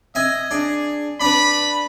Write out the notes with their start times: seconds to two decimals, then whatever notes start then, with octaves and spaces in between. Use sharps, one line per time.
0.15 D#5 E5 G#5
0.51 D4 G#4
1.21 D4 B4 B5